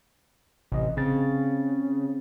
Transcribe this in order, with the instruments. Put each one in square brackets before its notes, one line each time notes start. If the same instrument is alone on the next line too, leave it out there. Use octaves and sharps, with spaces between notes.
[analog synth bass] A1 [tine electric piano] C3 E3 D#5
[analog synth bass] C#3 [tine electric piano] C4 A6